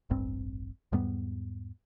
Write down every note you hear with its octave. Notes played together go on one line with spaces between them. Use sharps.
E1 A1 G2 C4
E2 G#2 G3 B3